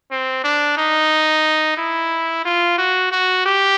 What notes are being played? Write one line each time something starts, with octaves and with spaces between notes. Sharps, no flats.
C4
D4
D#4
E4
F4
F#4
F#4
G4